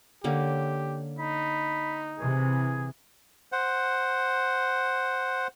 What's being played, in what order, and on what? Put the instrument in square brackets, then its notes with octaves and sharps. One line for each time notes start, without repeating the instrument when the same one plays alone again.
[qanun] D3 A#3 C#4 [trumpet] G4
[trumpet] D#4 [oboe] B5
[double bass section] C3 E3 [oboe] G#4
[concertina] C5 F#5